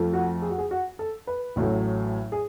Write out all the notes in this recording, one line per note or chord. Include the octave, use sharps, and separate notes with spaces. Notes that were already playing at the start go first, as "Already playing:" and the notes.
Already playing: F2 F3 A3
F#4
G#4
F#4
G#4
F#4
A4
B4
A1 A2 F#3 A3
G#4